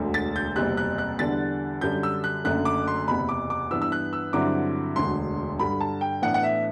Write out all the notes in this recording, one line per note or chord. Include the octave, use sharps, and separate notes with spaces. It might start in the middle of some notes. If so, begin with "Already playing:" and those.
Already playing: E1 D2 D3
A6
G6
F#1 E2 C3 G3 C4 F#6
F#6
F#6
E2 D3 G3 D4 A6
F#2 D3 G3 D4 G6
E6
F#6
F#1 F#2 D3 A3 F#6
D6
C6
F#1 E2 C3 B5
D6
D6
G2 E3 B3 D4 E6
E6
F#6
E6
G2 D3 F#3 C4 E4 D6
E1 D2 D3 C6
G2 D3 G3 B5
A5
G5
A2 E3 B3 D4 F#5
F#5
E5